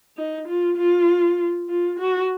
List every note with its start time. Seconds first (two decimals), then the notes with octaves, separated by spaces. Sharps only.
0.17 D#4
0.48 F4
0.77 F4
1.69 F4
1.99 F#4